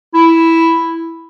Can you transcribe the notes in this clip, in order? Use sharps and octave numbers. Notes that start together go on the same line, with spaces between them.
E4